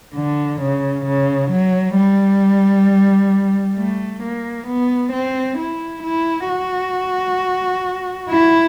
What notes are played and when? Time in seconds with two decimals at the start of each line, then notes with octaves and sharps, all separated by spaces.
0.16 D3
0.61 C#3
1.06 C#3
1.51 F#3
1.96 G3
3.77 A3
4.23 A#3
4.67 B3
5.13 C4
5.58 E4
6.03 E4
6.49 F#4
8.30 E4